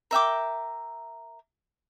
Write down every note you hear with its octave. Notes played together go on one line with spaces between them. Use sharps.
A#4 E5 G5 D6